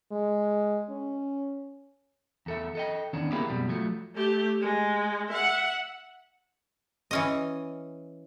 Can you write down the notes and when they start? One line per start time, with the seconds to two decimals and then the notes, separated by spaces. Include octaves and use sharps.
0.12 G#3
0.89 C#4
2.46 E2 A4 E5
2.75 A4 D#5 G5
3.13 E2 D#3 C#4 D4
3.32 A#3 C4 E4 G4 G#4 A#4
3.48 F#2 B2 G3
3.69 F3 F#3 A3
4.15 A3 G4
4.61 G#3
5.28 E5 F#5
7.11 E3 C#4 D#5